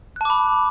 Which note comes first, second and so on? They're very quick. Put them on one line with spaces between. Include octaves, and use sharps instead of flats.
F#6 A5 D6 B5